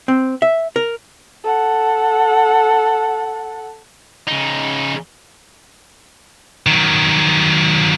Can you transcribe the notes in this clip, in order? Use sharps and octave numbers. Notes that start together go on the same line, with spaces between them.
C4
E5
A#4
A4 F#5
C#3 D#4
D#3 F#3